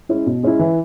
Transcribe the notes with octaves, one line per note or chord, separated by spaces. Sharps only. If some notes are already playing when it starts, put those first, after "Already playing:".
G#3 C#4 E4
B2
G#3 C#4 E4
E3